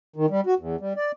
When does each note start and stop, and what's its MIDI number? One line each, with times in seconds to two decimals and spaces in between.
0.16 0.26 51
0.30 0.41 55
0.46 0.54 66
0.59 0.76 40
0.80 0.93 55
0.96 1.12 74